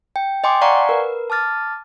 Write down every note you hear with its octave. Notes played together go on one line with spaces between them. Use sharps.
G5
D#5 G5 G#5 C6 D6
D5 F5 F#5 G#5 A#5 C#6
A#4 B4
A5 D6 F6 A6